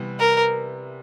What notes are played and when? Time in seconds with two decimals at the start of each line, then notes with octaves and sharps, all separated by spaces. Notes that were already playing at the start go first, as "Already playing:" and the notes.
Already playing: C3 E3 G3 B3
0.19 A#4